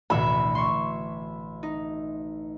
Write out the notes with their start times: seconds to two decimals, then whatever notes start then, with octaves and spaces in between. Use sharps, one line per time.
0.10 A1 D2 B2 E5 B5
0.55 C6 C#6
1.63 D#4